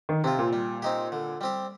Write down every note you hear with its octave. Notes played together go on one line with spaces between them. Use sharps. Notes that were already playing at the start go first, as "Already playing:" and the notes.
D#3
C3 C4 F4
A#2
G3
C4 D#4 G4
D3
G3 C4 G4